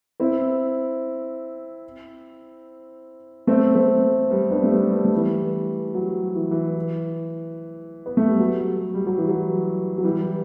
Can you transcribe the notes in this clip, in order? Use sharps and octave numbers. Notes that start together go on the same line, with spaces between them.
C4 E4
A3 C4
A3 C4
G3 B3
B3 D4
A3
G3 B3
G3
A3
E3 G3
F#3
E3
E3
B3
A3
G3
F#3
G3
F#3
E3
F#3
F#3
E3 G3